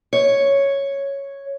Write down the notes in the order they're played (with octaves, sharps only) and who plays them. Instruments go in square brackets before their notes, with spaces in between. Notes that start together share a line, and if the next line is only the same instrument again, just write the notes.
[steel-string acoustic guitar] C#5